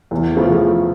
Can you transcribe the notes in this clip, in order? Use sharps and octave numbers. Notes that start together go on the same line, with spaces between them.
E2
C#3 F3 A3